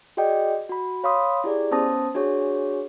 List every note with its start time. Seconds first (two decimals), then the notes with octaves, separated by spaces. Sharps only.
0.17 F#4 G#4 D5 D#5 G5
0.69 F#4 B5
1.04 C#5 F5 B5 C6 D#6
1.44 E4 G4 G#4 D5
1.71 B3 C#4 C5 A5 D#6 A#6
2.15 D4 F#4 G#4 C#5